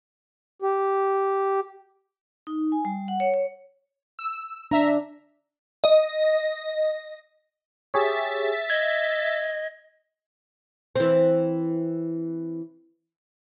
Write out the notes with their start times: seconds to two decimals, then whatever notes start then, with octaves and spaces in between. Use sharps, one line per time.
0.62 G4
2.47 D#4
2.72 G#5
2.85 G3
3.08 F#5
3.20 C#5
3.34 C#5
4.19 E6
4.71 D4 E5 A#5
5.84 D#5
7.94 G4 G#4 C#5 E5 A6 B6
8.70 D#5 G#6
10.96 E3 C4